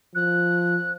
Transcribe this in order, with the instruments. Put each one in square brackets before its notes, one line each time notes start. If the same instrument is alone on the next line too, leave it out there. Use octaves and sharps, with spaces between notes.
[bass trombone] F3 [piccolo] F#6